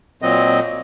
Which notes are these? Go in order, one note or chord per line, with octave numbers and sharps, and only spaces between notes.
A#2 F#3 C4 D#5